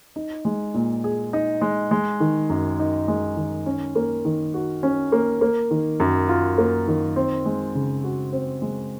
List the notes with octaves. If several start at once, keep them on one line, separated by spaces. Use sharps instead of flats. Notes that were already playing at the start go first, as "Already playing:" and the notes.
D#4
G#3
A#2
G#4
D#4
G#3
G#3
D#3
F#2
D#4
G#3
D#3
C#4
A#3
D#3
F#4
C#4
A#3
A#3
D#3
F#2
F4
A#3
D#3
C4
G#3
C#3
F#4
C4
G#3